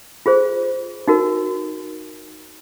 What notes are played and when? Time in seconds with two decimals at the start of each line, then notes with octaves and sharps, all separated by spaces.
0.26 F4 G#4 C5
1.08 D#4 F#4 A#4